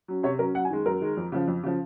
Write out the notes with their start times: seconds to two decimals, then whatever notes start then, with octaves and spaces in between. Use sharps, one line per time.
0.08 F#3 C#4
0.23 C3 C#5
0.39 F#3 C#4 A#4
0.55 F#2 F#5
0.65 G#5
0.70 D#3 G#3
0.86 F#2 A#4
1.01 D#3 G#3
1.17 F2
1.32 C#3 F3
1.48 F2
1.63 C#3 F3